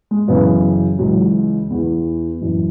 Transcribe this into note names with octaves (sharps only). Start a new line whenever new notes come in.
G#3
F#2 C#3 E3 B3
C#2 C#3 E3 F#3
E2 E3
F#2 E3